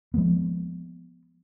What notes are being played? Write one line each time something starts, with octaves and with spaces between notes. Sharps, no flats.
F3 G#3 A#3 B3